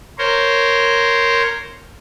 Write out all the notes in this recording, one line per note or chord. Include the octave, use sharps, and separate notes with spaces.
A#4 C5 C#5